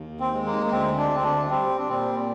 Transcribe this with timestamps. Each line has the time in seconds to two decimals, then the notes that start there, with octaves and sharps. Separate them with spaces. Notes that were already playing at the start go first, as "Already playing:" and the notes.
Already playing: D#2
0.20 C4
0.33 G#3
0.46 A#3
0.66 A#3
0.72 D2 C4
0.98 D4
1.11 D2 C4
1.24 D4
1.50 G3 C4
1.78 D4
1.89 A#2 C4